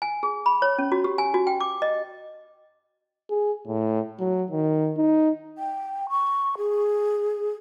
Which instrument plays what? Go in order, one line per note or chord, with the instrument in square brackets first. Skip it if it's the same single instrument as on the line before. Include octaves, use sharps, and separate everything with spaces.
[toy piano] G#5
G#4
B5
C#5
C#4
F#4
G4
G#5
F#4
G5
D6
D#5
[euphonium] G#4
A2
F#3
D#3
D#4
[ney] G5
C#6
G#4